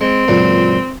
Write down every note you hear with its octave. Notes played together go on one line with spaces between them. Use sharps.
G#3 C4
C#2 F#2 A#2